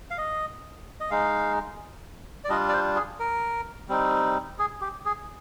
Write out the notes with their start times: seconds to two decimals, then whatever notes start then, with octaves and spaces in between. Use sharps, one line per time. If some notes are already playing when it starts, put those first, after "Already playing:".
0.11 F5
0.18 D#5
1.00 D#5
1.11 G#3 D#4 F5
2.44 D5
2.49 G3 D4 F4 D#5
2.69 D5
2.73 C5
2.96 G#4
3.20 A#4
3.89 G3 C4 D#4
4.59 G#4
4.81 G4
5.05 G#4